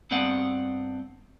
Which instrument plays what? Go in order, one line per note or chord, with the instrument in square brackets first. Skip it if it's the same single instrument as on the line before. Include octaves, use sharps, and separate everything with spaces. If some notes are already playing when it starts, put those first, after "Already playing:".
[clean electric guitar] G2 B3 C4 D5 F#5